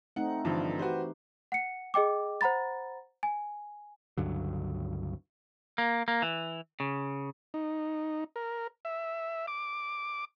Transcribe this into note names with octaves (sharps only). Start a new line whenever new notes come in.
A3 C4 D#4 F#5
G2 D3 E3 F3
F#4 G4 B4 C5
F#5 C#7
G#4 D#5 G5 D6
C5 F#5 A#5 B5 A6
G#5
C#2 G2 D3 F#3
A#3
A#3
E3
C#3
D#4
A#4
E5
D6